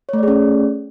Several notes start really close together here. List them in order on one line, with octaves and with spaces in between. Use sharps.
C#5 A3 D5 G#4 C#4